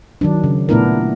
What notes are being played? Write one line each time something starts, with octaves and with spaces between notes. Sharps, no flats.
D#3 F#3 D4
C#3
A#2 A3 B3 D4 E4 A#4